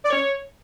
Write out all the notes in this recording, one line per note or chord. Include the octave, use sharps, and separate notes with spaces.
D5
C#5